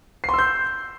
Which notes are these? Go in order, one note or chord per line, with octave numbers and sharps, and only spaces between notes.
C6 E6 G6 C7